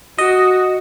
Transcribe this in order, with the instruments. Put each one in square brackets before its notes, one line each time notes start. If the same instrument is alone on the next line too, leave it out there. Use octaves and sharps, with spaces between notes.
[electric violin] F#4 [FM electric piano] D#5